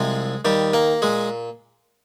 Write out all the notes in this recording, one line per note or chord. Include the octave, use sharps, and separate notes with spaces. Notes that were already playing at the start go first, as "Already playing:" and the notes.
Already playing: C2 C3 F3 G#3 G#4
D#2 D#3 G3 G4
A#3 A#4
A#2 G#3 G#4